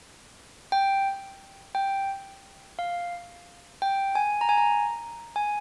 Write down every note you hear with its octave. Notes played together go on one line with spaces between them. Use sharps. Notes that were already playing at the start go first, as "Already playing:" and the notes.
G5
G5
F5
G5
G#5
A#5
G#5
A#5
G#5